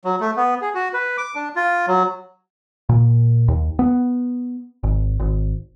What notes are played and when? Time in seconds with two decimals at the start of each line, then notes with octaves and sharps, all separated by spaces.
0.05 F#3
0.20 A3
0.36 B3
0.62 G#4
0.75 F#4
0.94 B4
1.18 D6
1.35 D4
1.56 F4
1.87 F#3
2.89 A#2
3.48 D#2
3.79 B3
4.83 G#1
5.20 G#1